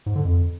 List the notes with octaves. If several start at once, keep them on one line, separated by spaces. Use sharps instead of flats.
G#2
D3
F2